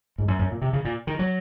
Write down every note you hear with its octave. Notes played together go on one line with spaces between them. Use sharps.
G#2
F#2
F#2
A#2
C3
C#3
A#2
D#3
F#3